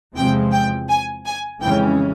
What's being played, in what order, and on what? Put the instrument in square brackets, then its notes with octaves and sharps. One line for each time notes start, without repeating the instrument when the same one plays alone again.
[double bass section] E2 C3 F3 G#3 C4 [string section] G5
[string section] G5
G#5
G#5
[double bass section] F2 C#3 E3 G#3 C#4 [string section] G5